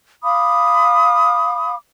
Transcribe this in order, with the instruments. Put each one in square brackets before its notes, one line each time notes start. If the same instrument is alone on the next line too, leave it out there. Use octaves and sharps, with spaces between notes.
[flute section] F5 B5 D6 D#6